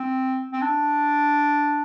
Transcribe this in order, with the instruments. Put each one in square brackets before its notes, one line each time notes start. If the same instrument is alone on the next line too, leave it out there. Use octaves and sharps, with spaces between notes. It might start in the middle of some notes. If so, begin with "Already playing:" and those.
Already playing: [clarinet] C4
C4
D4